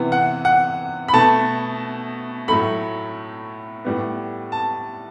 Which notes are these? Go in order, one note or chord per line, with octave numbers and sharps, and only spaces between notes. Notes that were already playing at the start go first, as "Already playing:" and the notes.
Already playing: C3 E3 B3
F#5
F#5
B5
B2 A3 A5
A2 F#3 A3 B5
A2 G3 B3
A5